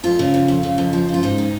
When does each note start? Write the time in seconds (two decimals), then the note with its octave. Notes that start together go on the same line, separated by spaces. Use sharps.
0.04 F2 F4
0.19 C#3
0.34 F2
0.48 F2
0.63 C#3
0.78 F2
0.93 F3
1.09 C#3
1.14 F4
1.23 G#2 D#4
1.38 D#3